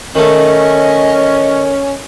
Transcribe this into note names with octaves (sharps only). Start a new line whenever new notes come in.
D#3 A3 C#4 D#5